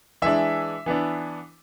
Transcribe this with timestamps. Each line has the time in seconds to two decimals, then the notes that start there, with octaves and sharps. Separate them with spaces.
0.22 E3 G#3 D4 E5
0.86 E3 B3 D4